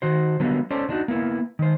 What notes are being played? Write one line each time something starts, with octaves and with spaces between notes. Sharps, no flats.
D#3 F#4 C5
D3 F#3 G3 A#3 B3
C#4 A4 C5 D5
D3 D4 D#4 F#4
A#3 B3 E4
D#3 C5